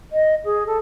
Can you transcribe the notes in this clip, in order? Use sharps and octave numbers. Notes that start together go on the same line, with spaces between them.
D#5
G#4
A4